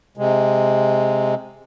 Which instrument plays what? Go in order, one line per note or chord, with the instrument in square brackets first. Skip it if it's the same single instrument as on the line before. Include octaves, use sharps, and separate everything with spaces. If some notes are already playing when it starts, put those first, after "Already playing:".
[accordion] C3 G#3